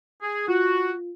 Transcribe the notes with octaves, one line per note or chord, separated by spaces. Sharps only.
G#4
F4 F#4